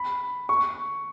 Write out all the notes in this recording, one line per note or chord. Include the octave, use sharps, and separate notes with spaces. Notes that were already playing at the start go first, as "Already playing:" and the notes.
Already playing: B5
C#6